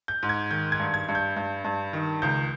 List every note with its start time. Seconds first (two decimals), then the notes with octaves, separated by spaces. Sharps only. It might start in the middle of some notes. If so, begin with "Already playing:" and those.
0.08 G6
0.23 G#2
0.29 G#6
0.51 D#3 G6
0.72 G#6
0.79 G2
0.94 G#6
1.08 G2
1.15 G6
1.36 G2
1.64 G2
1.93 D#3
2.22 C#2 G6